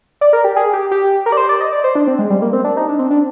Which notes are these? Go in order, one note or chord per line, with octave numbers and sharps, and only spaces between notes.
D5
A#4
G4
G#4
G4
G4
A#4
D5
C5
D5
D#5
D5
C5
D4
C4
G#3
G3
A#3
C4
D4
D#4
D4
C4
D4